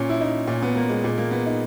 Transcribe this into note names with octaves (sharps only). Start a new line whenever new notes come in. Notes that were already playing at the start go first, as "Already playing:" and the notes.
Already playing: A#2 C#4
E4
D#4
A#2 C#4
B3
A#3
G#3
A#2 G#3
A#3
B3
D#4